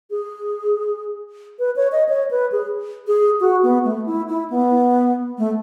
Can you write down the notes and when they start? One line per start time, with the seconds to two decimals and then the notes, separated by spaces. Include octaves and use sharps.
0.11 G#4
1.59 B4
1.76 C#5
1.92 D#5
2.09 C#5
2.31 B4
2.52 G#4
3.07 G#4
3.40 F#4
3.63 B3
3.85 A3
4.06 E4
4.28 E4
4.50 B3
5.38 A3